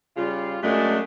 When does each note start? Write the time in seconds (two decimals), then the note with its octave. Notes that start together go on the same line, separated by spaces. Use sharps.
0.17 C#3 G3 F4
0.63 F#2 F#3 G#3 A3 D4